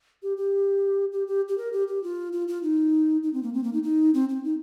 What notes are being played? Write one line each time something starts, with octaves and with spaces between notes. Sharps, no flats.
G4
G4
G4
G4
G4
A#4
G4
G4
F4
F4
F4
D#4
D#4
C4
A#3
C4
A#3
D#4
D#4
C4
C4
D#4